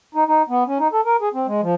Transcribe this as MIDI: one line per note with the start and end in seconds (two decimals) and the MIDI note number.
0.15 0.24 63
0.28 0.42 63
0.49 0.64 59
0.67 0.78 61
0.79 0.88 63
0.93 1.01 69
1.05 1.17 70
1.21 1.29 68
1.34 1.47 60
1.47 1.61 56
1.62 1.75 53